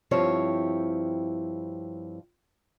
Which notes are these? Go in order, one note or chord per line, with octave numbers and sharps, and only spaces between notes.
G2 F3 C4 E4 G4 C#5